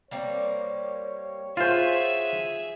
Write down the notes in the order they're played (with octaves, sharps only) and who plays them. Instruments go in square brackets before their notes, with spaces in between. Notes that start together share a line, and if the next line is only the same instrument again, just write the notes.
[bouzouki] G3 A#3 C4 [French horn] C#5
[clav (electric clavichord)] F4 C5 [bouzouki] F#4 [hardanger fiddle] G#4 E5